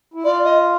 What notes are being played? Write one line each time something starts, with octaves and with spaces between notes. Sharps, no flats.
E4
F4 D5
D#5